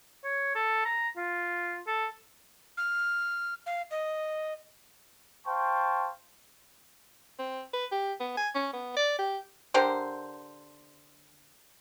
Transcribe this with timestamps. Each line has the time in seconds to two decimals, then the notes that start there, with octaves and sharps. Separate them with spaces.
0.24 C#5
0.55 A4
0.85 A#5
1.17 F4
1.87 A4
2.77 F6
3.66 F5
3.91 D#5
5.46 C5 F5 G5 A5 C#6
7.39 C4
7.73 B4
7.91 G4
8.20 B3
8.37 G#5
8.55 C#4
8.73 B3
8.97 D5
9.18 G4
9.74 D3 G4 A#4 C5